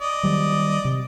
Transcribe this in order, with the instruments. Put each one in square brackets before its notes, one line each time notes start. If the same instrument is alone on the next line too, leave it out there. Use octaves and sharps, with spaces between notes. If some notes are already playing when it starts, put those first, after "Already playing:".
[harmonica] D5 D#5
[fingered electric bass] D#3 F#3 G3
C3